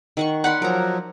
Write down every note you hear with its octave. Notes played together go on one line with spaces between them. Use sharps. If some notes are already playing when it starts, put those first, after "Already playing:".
D#3 F#5 C#6
D#4 D5 F#5 B5 C6
F3 F#3 A#4 A#5